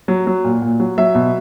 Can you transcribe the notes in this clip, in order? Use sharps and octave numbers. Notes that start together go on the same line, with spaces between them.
F#3
F#3
A#2
A#2
F#3
F#3 E5
B2